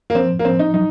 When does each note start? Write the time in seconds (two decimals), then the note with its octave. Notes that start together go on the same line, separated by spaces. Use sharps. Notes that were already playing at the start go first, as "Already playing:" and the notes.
0.10 A#3
0.15 F3 C4
0.39 A#3
0.45 F3 C4
0.59 D#4
0.74 F#3 D#4